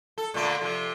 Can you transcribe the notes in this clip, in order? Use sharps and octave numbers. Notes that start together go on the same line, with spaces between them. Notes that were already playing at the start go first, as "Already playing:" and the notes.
A4
A#2 D3 A3
C3 F3